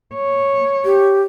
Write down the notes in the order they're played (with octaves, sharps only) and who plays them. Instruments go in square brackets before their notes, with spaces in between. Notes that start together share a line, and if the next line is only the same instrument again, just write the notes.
[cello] C#5
[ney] G4